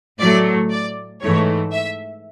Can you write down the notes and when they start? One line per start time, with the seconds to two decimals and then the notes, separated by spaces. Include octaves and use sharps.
0.19 A2 F#3 A3 D5
0.69 D5
1.21 G#2 E3 A3 C#5
1.71 E5